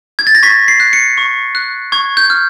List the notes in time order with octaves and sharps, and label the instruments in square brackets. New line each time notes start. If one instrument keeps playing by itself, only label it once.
[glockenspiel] G#6
A6
A#6
C#6 B6
C7
F#6
C#7
C#6
F#6
C#6 G#6
G6
F6